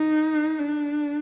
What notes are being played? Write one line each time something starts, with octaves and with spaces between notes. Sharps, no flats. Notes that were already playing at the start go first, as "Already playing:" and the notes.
Already playing: D#4
D4